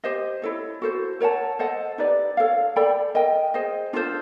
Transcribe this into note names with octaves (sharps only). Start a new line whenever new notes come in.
G4 C5 D#5
E4 A4 C#5
F#4 A4 C5
A#4 C#5 F#5 A5
A4 C5 D#5 F#5
D#4 G4 B4 D5
A4 C#5 F5
A4 D5 G5 B5
A#4 D#5 G5
G#4 C5 D#5
D4 F4 A4 C5